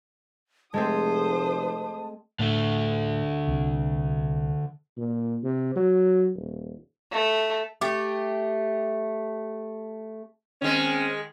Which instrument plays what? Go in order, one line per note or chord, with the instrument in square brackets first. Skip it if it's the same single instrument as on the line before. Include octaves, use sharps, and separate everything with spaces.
[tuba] F1 [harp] G#3 A3 C4 [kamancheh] C5 D#6 [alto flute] A5
[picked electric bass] A2 [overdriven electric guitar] D3 A3
[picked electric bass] C2
[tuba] A#2
C3
F#3
D#1
[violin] A3
[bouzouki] A3 G4
[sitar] D#3 G#3 [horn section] C4 C#4